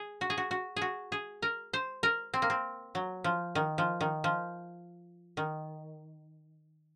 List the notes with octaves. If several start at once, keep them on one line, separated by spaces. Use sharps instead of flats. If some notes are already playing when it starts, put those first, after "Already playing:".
Already playing: G#4
F#4
G#4
F#4
F#4
G#4
F#4
G#4
A#4
C5
A#4
C4
A#3
C4
F#3
F3
D#3
F3
D#3
F3
D#3